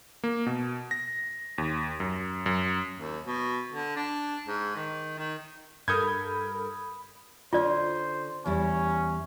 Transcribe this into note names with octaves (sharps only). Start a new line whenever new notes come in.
A#3
B2
A#6
D#2
F#2
F#2
D#2
B2
D3
D4
G#2
D#3
D#3
G2 A4 A#4 B5 D#6 G6 G#6
D3 C#4 F4 C5 D5
E2 G3 C#4 E4